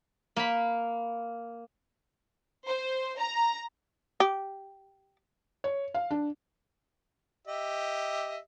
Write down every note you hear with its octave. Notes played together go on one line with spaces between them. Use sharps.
A#3 B5
C5
A#5
G4
C#5
F5
D4
G4 D#5 E5